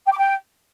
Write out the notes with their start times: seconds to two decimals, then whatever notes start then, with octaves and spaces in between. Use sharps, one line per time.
0.07 G5
0.12 D6
0.18 G5